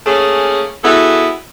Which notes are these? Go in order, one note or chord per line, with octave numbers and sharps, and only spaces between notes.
A3 A#3 C#4 G#4
B3 E4 F#4 G#4 A4